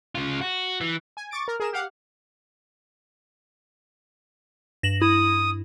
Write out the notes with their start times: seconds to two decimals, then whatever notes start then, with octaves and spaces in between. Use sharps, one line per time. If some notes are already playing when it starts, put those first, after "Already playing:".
0.15 C#3 F4
0.41 F#4
0.81 E3
1.17 G#5
1.31 C#6 D6 A6 D7
1.48 A#4
1.60 G#4 A#4 E7
1.73 G4 F5 F#5
4.83 G2 A#6 E7 F#7
5.01 E4 D#6